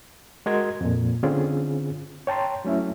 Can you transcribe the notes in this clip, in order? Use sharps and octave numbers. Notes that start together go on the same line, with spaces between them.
G#3 F#4 A#4 D#5 C6 G#6
F2 A#2
D3 C4 C#4 F4 G#4
C#5 G5 A5 A#5 C6
F#3 A3 C#4 E4 E5